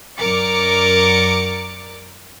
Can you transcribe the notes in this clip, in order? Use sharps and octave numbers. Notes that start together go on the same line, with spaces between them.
F#2 A#4 D5 D6 C#7